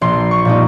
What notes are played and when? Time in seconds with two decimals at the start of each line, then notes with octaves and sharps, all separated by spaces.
0.01 A#1 C6
0.31 C#6
0.45 A#2 G3 A#3 D#4